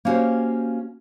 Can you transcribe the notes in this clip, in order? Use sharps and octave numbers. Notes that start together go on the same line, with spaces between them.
A#3 B3 C#4 F#4 G4 C5